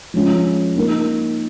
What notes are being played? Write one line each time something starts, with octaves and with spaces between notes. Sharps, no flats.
F3 G#3 C#4
A#3 D#4 A#4